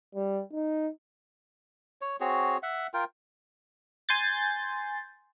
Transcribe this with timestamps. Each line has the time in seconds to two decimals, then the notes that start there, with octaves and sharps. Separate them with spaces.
0.15 G3
0.52 D#4
2.01 C#5
2.20 C4 F#4 G#4 C#5
2.63 E5 F#5
2.94 F4 A#4 G5
4.09 G#5 C6 G6 A6